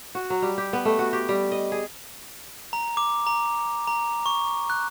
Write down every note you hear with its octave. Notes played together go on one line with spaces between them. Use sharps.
F#4
F#3
G3
G4
B3
A3
F#4
G4
G3
D#5
G#4
A#5
D6
A#5
A#5
C#6
F#6